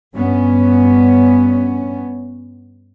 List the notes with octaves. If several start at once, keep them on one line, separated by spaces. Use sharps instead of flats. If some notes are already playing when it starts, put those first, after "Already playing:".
G2 B3 C#4